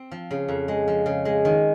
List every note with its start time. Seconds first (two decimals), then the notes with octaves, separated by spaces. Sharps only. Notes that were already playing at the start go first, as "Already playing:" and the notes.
Already playing: C4
0.11 F3
0.31 C#3
0.48 F2
0.68 G#3
0.88 F3
1.06 C#3
1.25 G#3
1.45 D#3